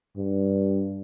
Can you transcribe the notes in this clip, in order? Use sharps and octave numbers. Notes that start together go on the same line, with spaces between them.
G2